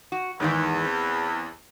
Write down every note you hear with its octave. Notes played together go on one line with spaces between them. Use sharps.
F#4
E2 G#2 D#3 E3
C4